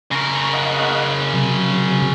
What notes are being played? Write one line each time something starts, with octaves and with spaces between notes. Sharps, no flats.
C#3 A#4 C#6 A#6
D#5 F5 F#5
C3 F#3